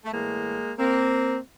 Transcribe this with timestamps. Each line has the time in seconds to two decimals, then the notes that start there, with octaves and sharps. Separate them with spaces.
0.05 A3
0.12 A2 E3 G#3 A#3
0.78 A#3 C4